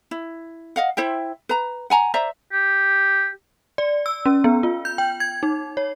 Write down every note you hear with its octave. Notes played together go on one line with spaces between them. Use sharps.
E4
D#5 F5 F#5
E4 C5 E5 G5
B4 A#5
F#5 G#5 A#5
C5 D5 E5 A#5
G4
D5
E6
C#4
B3
F4
G6
G5
G#6
D#4
C#5